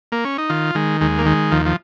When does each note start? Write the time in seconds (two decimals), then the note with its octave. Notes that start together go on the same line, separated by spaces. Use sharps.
0.12 A#3
0.25 C#4
0.38 D#4
0.49 D#3 F4
0.75 D#3 G#3
1.01 D#2 G#3
1.18 A#3
1.26 D#3 G#3
1.51 D#2 F3
1.66 F3